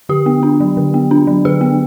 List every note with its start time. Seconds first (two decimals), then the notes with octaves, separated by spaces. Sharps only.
0.09 D3 G4
0.26 B3
0.43 D4
0.60 F#3
0.77 D3
0.94 B3
1.11 D4
1.27 F#3
1.45 D3 G#4
1.61 B3